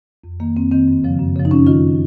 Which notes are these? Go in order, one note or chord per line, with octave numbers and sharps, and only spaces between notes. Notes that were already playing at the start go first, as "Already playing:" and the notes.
F2
D#3 A#3
F2 C4
D#3 C4
F#2
C#3 F3
F#2
C#3 F3
D#4
F#2 C#4
D#3 F4